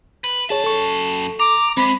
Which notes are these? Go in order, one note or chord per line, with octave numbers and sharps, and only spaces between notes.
B4
F#2 G#4 C#5 A5
A4 C#6
A#5 D6
G#3 C4 B5